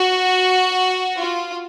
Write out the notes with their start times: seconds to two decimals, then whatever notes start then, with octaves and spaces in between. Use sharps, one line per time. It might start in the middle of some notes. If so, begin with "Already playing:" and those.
Already playing: F#4
1.18 F4